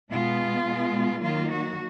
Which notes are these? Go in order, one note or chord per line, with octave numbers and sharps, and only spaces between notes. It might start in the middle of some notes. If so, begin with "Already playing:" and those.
B2 G#3 B3 F4
B2 G#3 B3
D#3 F#3 A#3 F4
F#4